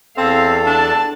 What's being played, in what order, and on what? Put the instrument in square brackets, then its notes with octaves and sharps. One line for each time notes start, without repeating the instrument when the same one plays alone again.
[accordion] E2 A4 [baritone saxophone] C4 [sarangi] F5
[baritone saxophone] D4 [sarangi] A5